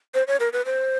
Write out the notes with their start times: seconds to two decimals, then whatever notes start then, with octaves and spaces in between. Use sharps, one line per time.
0.15 C5
0.28 C#5
0.40 A#4
0.53 B4
0.65 C5